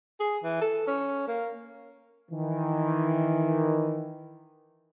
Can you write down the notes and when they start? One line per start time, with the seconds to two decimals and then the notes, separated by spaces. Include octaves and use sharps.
0.20 G#4
0.43 E3
0.61 A4
0.87 C#4
1.28 A#3
2.31 D#3 E3